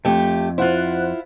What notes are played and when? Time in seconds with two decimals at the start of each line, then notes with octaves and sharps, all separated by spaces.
0.05 F2 A3 G4
0.58 E4 F4 C5 F#5 F#6